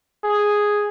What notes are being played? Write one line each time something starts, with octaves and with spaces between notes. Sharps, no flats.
G#4